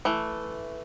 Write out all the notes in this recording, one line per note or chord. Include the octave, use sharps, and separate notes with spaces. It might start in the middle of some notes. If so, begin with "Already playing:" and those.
E3 A3